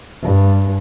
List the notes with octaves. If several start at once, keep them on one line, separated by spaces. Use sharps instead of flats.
G2